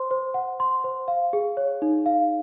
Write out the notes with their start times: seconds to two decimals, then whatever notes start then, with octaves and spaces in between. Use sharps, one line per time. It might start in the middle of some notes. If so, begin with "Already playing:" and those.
Already playing: C5 C6
0.11 C5
0.34 F#5
0.60 C6
0.84 C5
1.08 F5
1.33 G#4
1.57 C#5
1.82 D#4
2.06 F5